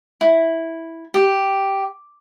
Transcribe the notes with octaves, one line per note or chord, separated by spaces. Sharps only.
E4
G4